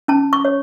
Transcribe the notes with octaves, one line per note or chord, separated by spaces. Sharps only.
C#4 A5
C#6
C#5